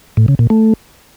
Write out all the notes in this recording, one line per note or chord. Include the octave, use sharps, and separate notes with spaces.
A2
C#3
A#2
A3